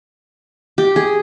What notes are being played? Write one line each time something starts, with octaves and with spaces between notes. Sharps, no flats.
G4
G#4